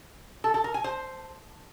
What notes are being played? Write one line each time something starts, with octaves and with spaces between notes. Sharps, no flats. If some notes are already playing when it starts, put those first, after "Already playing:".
A4
A4
A#4
G#5
C5